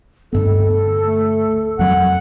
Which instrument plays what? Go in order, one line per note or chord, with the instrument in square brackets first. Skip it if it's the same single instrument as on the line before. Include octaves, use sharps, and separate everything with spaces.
[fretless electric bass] D2 G2 B3 [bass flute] A4
[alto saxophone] A3
[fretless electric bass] F2 F#3 [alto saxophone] F#5